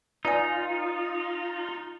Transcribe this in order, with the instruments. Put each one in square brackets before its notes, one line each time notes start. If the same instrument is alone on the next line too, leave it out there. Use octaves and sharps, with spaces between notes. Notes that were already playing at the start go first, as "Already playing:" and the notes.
[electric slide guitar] D#4 [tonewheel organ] F4 [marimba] B4 D5 G#5